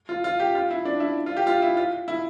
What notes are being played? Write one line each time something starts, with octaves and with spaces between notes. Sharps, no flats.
F4
F4
G4
F4
E4
D4
E4
F4
G4
F4
E4
F4
E4